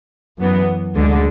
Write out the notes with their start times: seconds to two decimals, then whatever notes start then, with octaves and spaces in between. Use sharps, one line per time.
0.39 F#2 E3 B3
0.95 D2 D3 G#3